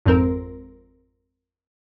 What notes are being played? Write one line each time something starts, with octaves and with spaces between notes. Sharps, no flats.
G#1 F2 C4 A#4